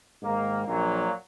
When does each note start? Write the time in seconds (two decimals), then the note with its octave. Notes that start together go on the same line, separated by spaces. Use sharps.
0.22 G#2 D#3 A#3
0.66 A#1 A#2 F#3 A#3